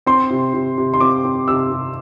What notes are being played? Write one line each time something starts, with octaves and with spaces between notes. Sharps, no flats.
C4 C6
C3
C3
C3
C6
C4 D6
C4
C3 E6
C3